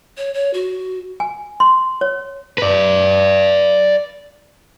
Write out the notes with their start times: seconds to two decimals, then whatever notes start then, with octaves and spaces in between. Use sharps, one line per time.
0.17 C#5
0.34 C#5
0.54 F#4
1.20 G#5
1.60 C6
2.01 C#5
2.58 B4 D5